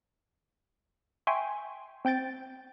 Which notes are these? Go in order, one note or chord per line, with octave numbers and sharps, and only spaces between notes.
E5 G5 G#5 C6 C#6
C4 G5 G6 A6 D7